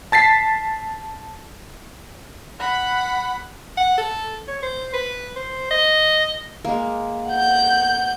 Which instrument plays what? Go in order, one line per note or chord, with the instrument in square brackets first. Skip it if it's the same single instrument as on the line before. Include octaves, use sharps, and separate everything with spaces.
[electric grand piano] A5 A6 B6 C7
[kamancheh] F#5 B5
[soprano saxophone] F#5
A4
C#5
C5
B4
C5
D#5
[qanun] G#3 A#3
[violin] F#5 G6